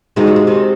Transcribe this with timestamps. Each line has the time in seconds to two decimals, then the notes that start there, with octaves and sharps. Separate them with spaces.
0.16 C3 D#3 G#3 D#4 F#4
0.27 C#3
0.36 C3
0.47 C3 D#3